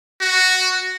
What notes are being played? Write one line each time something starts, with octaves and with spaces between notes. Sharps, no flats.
F#4